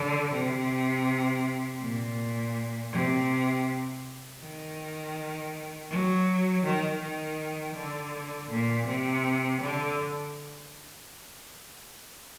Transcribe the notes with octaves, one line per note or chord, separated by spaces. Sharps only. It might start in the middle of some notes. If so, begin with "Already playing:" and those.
Already playing: D3
C3
A#2
C3
D#3
F#3
D#3
D#3
D3
A#2
C3
D3